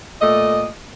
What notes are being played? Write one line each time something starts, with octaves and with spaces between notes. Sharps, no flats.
A#2 A3 D5 D#5